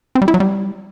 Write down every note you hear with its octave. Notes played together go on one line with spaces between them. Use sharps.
C4
G3
E4
F#3
G3